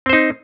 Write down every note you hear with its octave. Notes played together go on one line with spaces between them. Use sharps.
C4 D#4 C5